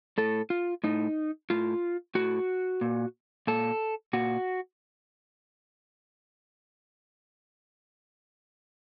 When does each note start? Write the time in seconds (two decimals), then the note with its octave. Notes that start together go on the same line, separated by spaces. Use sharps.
0.18 A2 A4
0.50 F4
0.84 A2 D#4
1.50 A2 F4
2.15 A2 F#4
2.81 A#2
3.47 A#2 A4
4.13 A#2 F#4